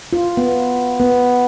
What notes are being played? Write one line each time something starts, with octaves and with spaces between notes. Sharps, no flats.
F4
B3
B3